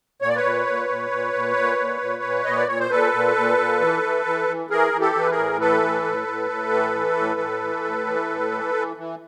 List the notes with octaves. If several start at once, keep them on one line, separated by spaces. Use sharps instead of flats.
A#2 C#5
D5
B4 C#5
A#2
A#2
A#2
A#2
A#2
A#2
A#2
A#2
A#2
A#2 D#5
D5
A#2 C#5
C5
A#2 A4 B4
A#2
A#2
A#2
E3
E3
E3
E3
E3 G#4 A#4
E3
G4 A4
E3 B4
G#4 A#4
A2
E3 A4 B4
A2
A2
A2
A2
E3
E3
A2
A2
E3
A2
E3
A2
E3
E3
E3